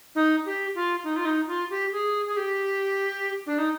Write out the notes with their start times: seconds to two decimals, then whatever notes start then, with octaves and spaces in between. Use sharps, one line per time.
0.15 D#4
0.45 G4
0.75 F4
1.04 D#4
1.16 F4
1.25 D#4
1.48 F4
1.70 G4
1.92 G#4
2.26 G#4
2.37 G4
3.46 D4
3.58 D#4